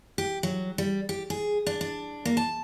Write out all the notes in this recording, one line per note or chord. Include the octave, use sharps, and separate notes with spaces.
G4
F#3
G3
G4
G#4
D4
D4
A#3
A5